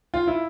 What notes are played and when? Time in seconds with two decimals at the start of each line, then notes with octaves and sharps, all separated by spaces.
0.14 F4
0.27 E4